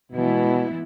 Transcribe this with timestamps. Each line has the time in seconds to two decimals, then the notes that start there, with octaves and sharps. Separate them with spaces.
0.12 B2 E3 G#3 B3 E4